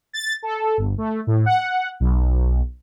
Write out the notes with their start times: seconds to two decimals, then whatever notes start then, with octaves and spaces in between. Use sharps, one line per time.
0.13 A6
0.43 A4
0.78 G1
0.98 A3
1.27 A2
1.46 F#5
2.00 B1